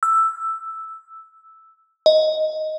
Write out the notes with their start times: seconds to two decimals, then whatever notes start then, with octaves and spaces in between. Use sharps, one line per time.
0.03 E6
2.06 D#5